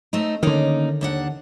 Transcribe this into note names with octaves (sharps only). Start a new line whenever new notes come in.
A3 C4 D#4
D3 D#3 A#3 C#4 D#4
D#2 D4 F#5